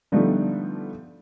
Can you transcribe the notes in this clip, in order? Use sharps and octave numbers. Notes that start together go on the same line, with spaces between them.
D3 F3 G3 A3 B3 D#4